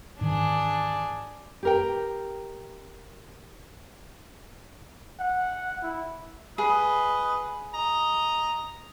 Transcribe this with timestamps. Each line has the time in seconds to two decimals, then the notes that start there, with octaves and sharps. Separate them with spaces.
0.21 G#2 D#3 E3 D4 G#4
1.63 G4 A#4 G5
5.20 F#5
5.82 E4
6.58 G#4 B4 D#5
7.74 D#5 A#5